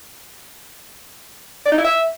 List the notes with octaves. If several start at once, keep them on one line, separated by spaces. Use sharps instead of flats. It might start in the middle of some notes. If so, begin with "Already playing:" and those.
D5
D#4
E4
E5